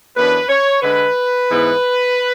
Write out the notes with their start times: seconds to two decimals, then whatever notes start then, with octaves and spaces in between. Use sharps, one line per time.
0.15 F#2 E3 B3 D4 B4
0.49 C#5
0.82 D3 G#3 D4 B4
1.50 G#2 E3 B3 E4